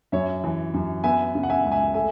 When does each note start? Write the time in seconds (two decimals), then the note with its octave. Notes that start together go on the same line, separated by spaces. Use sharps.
0.12 F#2 C#5 E5
0.44 E3
0.74 F#2
1.04 B3 E5 G#5
1.35 C#3
1.43 F#5
1.50 E5 G#5
1.65 C#2
1.72 E5 G#5
1.94 A3 E5 G#5